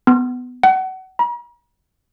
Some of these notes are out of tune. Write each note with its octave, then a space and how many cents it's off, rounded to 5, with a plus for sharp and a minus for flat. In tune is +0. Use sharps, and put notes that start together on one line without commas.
B3 +15
F#5 +30
A#5 +45